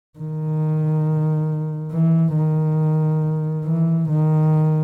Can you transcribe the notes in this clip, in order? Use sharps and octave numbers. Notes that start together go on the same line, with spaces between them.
D#3
E3
D#3
E3
D#3